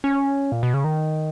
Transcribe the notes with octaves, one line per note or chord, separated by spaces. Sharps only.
C#4
A#2
B2
C#3
D#3